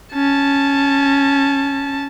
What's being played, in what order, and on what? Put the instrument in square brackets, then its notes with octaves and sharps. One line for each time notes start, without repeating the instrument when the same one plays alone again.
[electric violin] C#4 A5